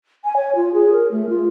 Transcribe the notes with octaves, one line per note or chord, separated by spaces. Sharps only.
G#5
C#5
F4
G#4
A#4
A3
F4